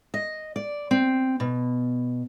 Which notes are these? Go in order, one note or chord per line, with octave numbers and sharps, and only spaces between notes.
D#5
D5
C4
B2